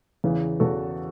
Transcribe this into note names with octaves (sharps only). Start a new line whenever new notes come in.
E2 C#3 E3
E2 C#3 E3 F#4 A4